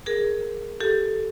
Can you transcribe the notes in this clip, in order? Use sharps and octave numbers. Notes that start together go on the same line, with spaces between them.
G#4 A#4
G4 A4